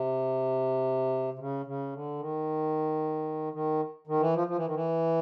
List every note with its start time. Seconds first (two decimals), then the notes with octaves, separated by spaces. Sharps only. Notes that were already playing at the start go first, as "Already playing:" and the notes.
Already playing: C3
1.34 C3
1.39 C#3
1.66 C#3
1.93 D3
2.19 D#3
3.53 D#3
4.07 D#3
4.20 E3
4.34 F3
4.47 F3
4.56 E3
4.66 D#3
4.74 E3